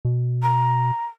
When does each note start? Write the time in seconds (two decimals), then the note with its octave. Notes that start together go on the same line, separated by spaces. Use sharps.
0.05 B2
0.42 A#5